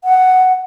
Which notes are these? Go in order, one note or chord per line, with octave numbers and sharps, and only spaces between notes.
F#5